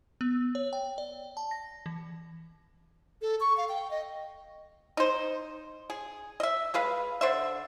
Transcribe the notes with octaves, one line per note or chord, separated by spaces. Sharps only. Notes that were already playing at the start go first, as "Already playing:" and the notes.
B3
C#5
G5
D5
A5
A#6
E3
A4
C#6
F5
G5
D#5
D#4 C5
G#4
D#5 E5
G#3 G#4 B4 F5
D3 C5 E5